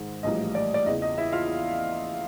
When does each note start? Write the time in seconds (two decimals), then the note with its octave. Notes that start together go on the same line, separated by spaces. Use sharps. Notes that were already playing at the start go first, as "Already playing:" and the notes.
Already playing: G#2 D#3 G#3
0.23 A#1 A2 E3 G3 A#3 D#5
0.55 D5
0.74 D5
0.86 E2 C#3 E3 D#5
1.02 D#5
1.18 E4 E5
1.32 F4 F5